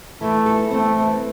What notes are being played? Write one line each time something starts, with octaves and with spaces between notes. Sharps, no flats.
E3 A3
A4
A3 C4
E3